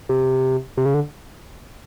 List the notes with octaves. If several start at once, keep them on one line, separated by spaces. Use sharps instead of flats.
C3
C3
C#3
D3